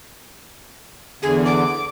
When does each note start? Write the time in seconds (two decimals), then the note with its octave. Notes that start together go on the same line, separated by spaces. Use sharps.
1.23 E2 D3 G#4
1.45 D6